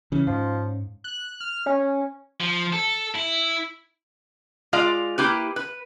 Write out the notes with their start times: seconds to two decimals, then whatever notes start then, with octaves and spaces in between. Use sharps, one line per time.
0.12 C#3 E3 C#4
0.27 G#2 F3
1.04 F#6
1.40 F6
1.66 C#4
2.41 F3
2.73 A4
3.16 E4
4.73 G#3 F4 D5 F5
5.18 A#3 E4 G4 B4
5.56 B4